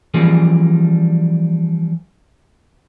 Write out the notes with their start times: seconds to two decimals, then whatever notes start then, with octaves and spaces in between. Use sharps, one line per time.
0.14 E3 F3 G3 A#3 C#4 G#4